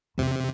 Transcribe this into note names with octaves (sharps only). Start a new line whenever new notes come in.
E2 C3